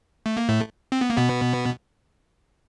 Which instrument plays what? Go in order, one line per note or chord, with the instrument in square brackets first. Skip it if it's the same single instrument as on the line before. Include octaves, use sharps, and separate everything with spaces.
[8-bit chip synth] A3
A#3
A2 A3
C4
B3
A#3
B2 B3